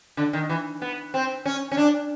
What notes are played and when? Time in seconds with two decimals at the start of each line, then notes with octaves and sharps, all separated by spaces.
0.17 D3
0.33 D#3
0.49 E3
0.82 B3
1.14 C4
1.45 C#4
1.72 C#4
1.77 D4